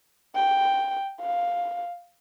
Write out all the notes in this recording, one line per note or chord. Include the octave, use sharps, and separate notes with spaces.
G5
F5